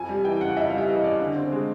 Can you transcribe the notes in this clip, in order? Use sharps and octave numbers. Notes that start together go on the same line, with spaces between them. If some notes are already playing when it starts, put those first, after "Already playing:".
Already playing: F2 G#5
G3
E3 G5
C#3 F#5
F2 E5
G3 F5
E5
E3 D#5
C#3 D5
D3
C4
G#3